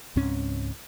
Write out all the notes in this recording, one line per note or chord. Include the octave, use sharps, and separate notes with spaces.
C#2 G#2 C4 C#4